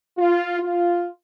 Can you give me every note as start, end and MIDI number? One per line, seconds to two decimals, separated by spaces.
0.18 0.58 65
0.59 1.07 65